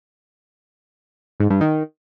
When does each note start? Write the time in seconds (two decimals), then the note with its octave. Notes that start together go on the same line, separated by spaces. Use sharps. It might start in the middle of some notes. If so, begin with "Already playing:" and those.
1.40 G#2
1.50 G2
1.61 D#3